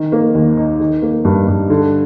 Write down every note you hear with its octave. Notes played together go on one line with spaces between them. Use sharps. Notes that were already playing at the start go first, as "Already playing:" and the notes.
Already playing: D#3
A#3
D#2
D#4
D#3
A#3
G2
G2
D3